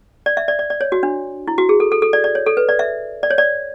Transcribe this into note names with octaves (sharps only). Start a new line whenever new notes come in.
D5
E5
D5
D5
D5
C#5
F#4
D4
E4
F#4
G#4
A4
A4
A4
D5
D5
C#5
A4
B4
D5
E5
D5
C#5
D5